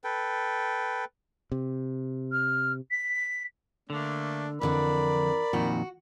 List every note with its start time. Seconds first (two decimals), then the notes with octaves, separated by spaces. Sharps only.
0.04 A4 B4 G5
1.52 C3
2.32 F6
2.91 B6
3.90 D3 A3 A#3 D4
4.61 F2 D3 E3 D4 A#4 D5 B5
5.53 F2 A#2 D#3 F#4